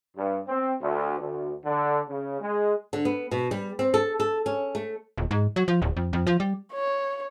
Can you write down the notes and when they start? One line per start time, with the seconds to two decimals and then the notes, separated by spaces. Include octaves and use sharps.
0.16 G2
0.48 C4
0.81 D2
1.18 D2
1.65 D3
2.08 C#3
2.39 G#3
2.93 D3
3.05 B3
3.31 B2
3.51 G3
3.79 C4
3.94 A4
4.20 A4
4.46 C#4
4.75 A3
5.18 D#1
5.31 G#2
5.56 F#3
5.68 F3
5.82 D1
5.97 F2
6.13 F2
6.27 F3
6.40 G3
6.72 C#5